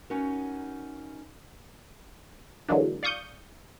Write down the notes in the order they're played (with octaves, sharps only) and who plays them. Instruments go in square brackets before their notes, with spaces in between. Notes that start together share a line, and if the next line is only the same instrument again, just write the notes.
[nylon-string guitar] C#4 D#4 F#4 A#4
[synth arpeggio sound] D3 E3 F#3 G#3 A#3 D4
D5 F5 C#6 D#6 G6